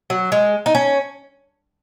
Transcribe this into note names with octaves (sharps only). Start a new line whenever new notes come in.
F#3
G#3
D#4
C#4